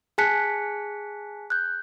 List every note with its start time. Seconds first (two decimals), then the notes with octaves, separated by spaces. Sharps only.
0.18 G#4 G#5 A5 F#6 B6 C#7
1.50 F#6 G6